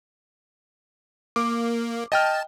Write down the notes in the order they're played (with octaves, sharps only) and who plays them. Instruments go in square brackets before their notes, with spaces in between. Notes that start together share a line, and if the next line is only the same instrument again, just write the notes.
[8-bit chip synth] A#3 [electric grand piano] D6
[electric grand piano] D#5 G5 F6 [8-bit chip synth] A5